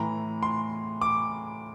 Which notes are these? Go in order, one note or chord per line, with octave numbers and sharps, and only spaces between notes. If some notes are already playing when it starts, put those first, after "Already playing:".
Already playing: A2 E3 A#5
C6
D6